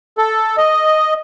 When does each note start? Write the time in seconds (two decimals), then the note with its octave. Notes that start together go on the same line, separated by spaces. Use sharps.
0.18 A4
0.57 D#5